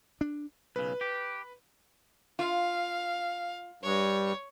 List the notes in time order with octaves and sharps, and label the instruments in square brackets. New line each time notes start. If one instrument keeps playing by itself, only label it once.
[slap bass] D4
[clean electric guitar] B1 C#3 [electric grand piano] B4
[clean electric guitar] G4
[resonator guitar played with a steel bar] F4 [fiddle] F5
[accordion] G2 [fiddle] C#5